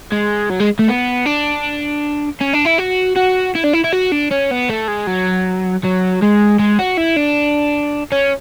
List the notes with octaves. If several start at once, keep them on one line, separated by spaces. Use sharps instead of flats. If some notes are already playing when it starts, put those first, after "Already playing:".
G#3
F#3
G#3
A3
B3
D4
C#4
D4
E4
F#4
F#4
E4
D4
E4
E4
F#4
D4
C#4
B3
A3
G#3
F#3
F#3
G#3
G#3
F#4
E4
D4
C#4